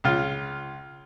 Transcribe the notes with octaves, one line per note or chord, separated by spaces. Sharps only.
C#2 F4